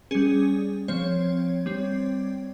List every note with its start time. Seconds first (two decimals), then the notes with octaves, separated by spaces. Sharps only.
0.11 G3 C#4 G#4
0.88 F3 C4 C#5
1.66 G3 C4